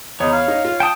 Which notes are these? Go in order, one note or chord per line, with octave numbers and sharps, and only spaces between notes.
E2 D#4 C#5
F5
D#4
F4
G5 A5 D#6